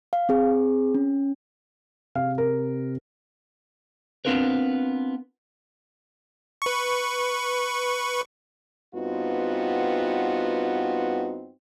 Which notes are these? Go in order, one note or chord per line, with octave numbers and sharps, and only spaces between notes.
F5
C4 G#4
C#4
C3 F5
A#4
B3 C4 D4 F4 A#4 B4
B4 C#6
G2 B3 C4 D#4 F4 F#4